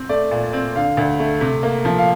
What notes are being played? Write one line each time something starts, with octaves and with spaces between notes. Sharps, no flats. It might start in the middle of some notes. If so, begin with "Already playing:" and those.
Already playing: C4
A3 D5
A#2
C4
D3 F5
D2
A3
C3
A#3
F3
F5